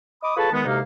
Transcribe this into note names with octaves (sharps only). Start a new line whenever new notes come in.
D#5 B5 D6 D#6
F4 G#4 A4 B4 C#5 A5
D#3 G#3 B3
D2 C3 G#3 A#3 D#4 F5